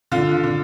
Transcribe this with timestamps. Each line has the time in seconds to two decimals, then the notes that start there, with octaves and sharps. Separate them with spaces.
0.12 D3 F4
0.43 D3